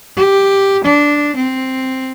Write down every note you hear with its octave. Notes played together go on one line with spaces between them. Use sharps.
G4
D4
C4